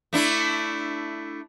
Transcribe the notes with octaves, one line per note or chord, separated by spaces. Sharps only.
A3 D4 E4